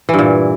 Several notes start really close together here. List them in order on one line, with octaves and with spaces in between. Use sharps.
E3 G2 A#2